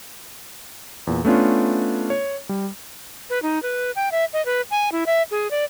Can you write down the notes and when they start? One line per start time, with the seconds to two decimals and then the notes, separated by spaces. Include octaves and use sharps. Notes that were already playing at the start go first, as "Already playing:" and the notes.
1.07 E2 A#2
1.25 A3 B3 C#4 D4 F4
2.10 C#5
2.49 G3
3.30 B4
3.43 D#4
3.63 B4
3.96 G5
4.12 E5
4.33 D#5
4.46 B4
4.71 G#5
4.92 E4
5.06 E5
5.31 G#4
5.51 D5